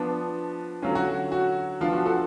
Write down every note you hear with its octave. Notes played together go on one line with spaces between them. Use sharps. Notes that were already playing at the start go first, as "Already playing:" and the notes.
Already playing: F3 B3 D4
D3 F#3 C#4 F4
F#4
F#4
F3 B3 D4 F4
F#4
F#4 A4